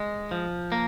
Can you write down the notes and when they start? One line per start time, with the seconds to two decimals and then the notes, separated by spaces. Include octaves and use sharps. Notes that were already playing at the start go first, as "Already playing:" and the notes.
Already playing: G#3
0.31 F3
0.72 A#3